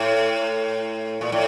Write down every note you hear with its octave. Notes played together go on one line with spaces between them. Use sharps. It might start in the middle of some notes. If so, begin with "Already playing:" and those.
Already playing: A2
A#2
A2